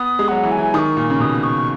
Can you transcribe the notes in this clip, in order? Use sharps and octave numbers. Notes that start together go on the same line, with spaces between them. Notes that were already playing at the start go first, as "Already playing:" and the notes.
Already playing: B3 D#6
G#3
F#3 F#5
E3
G#5
E3
D#3 C#6 D#6
A#2
C#3
B2 D#6
C#6